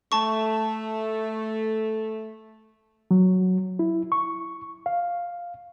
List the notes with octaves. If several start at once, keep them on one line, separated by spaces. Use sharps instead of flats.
A3 A5 C#6
F#3
E4
C#6
F5